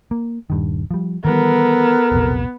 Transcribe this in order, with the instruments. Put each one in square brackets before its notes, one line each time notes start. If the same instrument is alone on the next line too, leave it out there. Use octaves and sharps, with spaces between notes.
[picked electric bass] A#3
D#1 G2 D#3
F3 G3
[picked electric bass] D#3 E3 G3 [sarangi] B3 [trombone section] A4 A#4
[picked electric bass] E1 A#1 C3